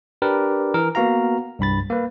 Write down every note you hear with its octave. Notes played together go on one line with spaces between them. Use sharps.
D4 G4 A#4 B4 D5
E3 A#4
A#3 B3 F#4 F5 A#5
C2 G2 B5 A6
A#3 B4